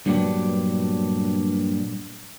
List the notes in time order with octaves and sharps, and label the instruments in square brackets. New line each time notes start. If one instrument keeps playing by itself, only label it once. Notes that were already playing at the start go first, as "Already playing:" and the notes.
[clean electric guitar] G2 A#2 F#3 B3 D4 G4